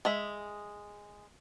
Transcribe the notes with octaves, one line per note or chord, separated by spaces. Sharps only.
G#3 G#4 E5